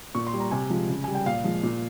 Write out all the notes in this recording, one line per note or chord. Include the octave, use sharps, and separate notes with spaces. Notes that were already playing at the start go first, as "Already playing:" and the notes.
A#2 C#6
C6
G3
A#5
C3 G#5
F3 G#3
C#3
G3 G#5
G5
A#2 F5
F3 G#3
A#2